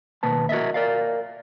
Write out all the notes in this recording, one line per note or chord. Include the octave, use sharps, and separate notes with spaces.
D#2 B2 A#3 B4 A5
F#4 A#4 D#5 E5
A#4 D5 F5